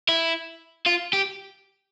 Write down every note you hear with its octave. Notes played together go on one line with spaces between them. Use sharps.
E4
F4
G4